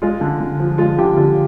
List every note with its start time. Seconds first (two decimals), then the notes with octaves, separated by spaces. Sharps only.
0.02 G#3 F4
0.21 D3
0.40 D3
0.60 F3
0.78 G#3 F4
0.98 D3 F4 G4
1.17 D3 F4